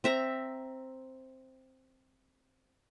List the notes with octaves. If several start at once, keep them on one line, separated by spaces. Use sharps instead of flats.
C4 E5 A#5